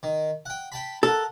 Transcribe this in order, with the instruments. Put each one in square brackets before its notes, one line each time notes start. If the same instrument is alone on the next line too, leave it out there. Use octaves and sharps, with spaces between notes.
[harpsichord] D#3
F#5 G5
G5 A5 B5
[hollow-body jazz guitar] A4 [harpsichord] A#4 F#5